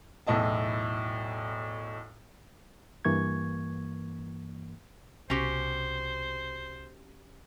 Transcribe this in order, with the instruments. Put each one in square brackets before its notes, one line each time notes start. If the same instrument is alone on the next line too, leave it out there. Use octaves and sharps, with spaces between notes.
[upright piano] B1 E2 A2 E4 D#5 A5
[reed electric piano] G2 E3 A#3 C#6 G#6
[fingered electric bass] C2 B2 [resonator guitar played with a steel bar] C#4 F#4 G4 [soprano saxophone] C5